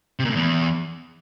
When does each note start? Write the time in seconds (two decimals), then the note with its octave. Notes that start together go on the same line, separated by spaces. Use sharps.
0.19 C3
0.25 A#2
0.30 A2
0.35 E2